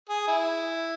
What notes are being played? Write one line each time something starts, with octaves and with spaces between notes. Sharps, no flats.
G#4
E4